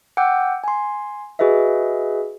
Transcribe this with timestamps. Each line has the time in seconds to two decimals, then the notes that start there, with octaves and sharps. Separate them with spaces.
0.17 F#5 G5 D6 E6 G6
0.64 G#5 C6
1.39 F#4 G#4 B4 D#5 E5